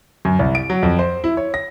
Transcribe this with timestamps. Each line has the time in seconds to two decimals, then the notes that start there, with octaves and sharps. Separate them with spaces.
0.25 F#2
0.39 C2
0.55 D7
0.70 F#3
0.83 F2
0.99 C5
1.24 E4
1.37 C#5
1.54 A#6